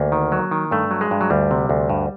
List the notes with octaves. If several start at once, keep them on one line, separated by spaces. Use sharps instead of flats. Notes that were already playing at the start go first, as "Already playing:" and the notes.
Already playing: D2 A#3
D#3
F#3
D#3
G2 A3
F#3
G#3
G2
F#3
D2 G3
C3
D2
G2